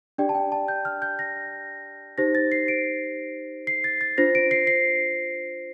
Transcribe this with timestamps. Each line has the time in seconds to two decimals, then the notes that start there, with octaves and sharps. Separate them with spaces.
0.18 D4 G4 D5 G5
0.29 A5
0.35 G5
0.52 A5
0.68 G6
0.85 F6
1.02 G6
1.19 A#6
2.18 D#4 G4 C5 A#6
2.35 A6
2.52 C7
2.68 D7
3.67 C7
3.84 A6
4.01 A6
4.18 D4 F4 C5 A#6
4.35 D7
4.51 C7
4.67 C7